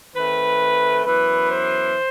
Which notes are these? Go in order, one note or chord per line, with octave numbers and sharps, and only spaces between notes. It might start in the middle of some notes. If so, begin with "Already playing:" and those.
D#3 A3 C4 B4
F#2 E3 B3 B4
C5